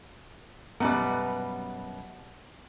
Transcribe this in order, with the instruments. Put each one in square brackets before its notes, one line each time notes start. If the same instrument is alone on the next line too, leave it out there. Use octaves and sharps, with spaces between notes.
[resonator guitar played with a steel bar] F#2 B2 G3 [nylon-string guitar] B3 B4